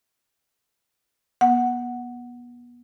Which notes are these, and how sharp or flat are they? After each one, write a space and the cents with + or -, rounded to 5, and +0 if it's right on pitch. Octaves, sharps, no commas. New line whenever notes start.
B3 -30 F#5 +0